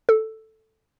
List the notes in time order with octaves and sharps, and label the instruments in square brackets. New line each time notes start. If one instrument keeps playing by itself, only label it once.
[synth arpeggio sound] A4